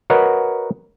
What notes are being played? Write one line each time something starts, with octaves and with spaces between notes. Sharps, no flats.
F#4 A#4 B4 C#5 D#5 F#5